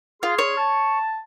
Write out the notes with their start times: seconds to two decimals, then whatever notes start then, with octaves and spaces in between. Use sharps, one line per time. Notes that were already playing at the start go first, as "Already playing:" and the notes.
0.23 F4 G#4 C6 F6
0.38 C#5
0.58 A5